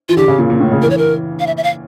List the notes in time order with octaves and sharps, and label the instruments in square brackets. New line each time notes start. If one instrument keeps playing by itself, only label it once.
[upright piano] E3 [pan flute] F4
[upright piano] D3 [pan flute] G4
[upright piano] C#3
A#2
A#2
A2
C#3
[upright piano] E3 [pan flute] A#4
[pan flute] C#5
A#4
F5
E5
E5
F5